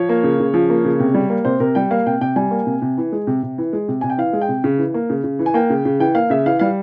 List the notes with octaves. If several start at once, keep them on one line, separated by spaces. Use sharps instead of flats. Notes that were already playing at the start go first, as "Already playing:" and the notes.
Already playing: F3 C#5
A#3
C#3
C#3
F3
A#3
C#3
C3
G3
A#3
C3 C5
C3 A#4
G3 G5
A#3 F5
C3 G5
C3 G5
G3 G#5
A#3
C3
C3
E3
G#3
C3
C3
E3
G#3
C3
C3 G#5
G5
E3 F5
G#3
G5
C3
C#3
E3
A#3
C#3
C#3
E3
G#5
A#3 G5
C#3
C#3
E3 G5
A#3 F5
C#3 E5
E3 F5
G3 F5